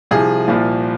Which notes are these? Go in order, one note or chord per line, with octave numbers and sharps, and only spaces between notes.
C2 C3 F3 G#4
C2 A#2 F3